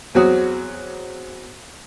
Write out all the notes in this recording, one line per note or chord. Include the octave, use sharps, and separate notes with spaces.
E2 F#3 C4 F#4 D#6